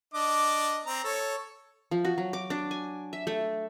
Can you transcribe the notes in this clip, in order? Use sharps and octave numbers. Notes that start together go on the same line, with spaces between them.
D4 D#5 D6
C4 A#5
A4 C#5
F3
F#4
F#3
D6
D4
G#5
E5
A3